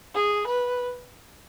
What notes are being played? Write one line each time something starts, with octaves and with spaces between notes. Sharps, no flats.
G#4
B4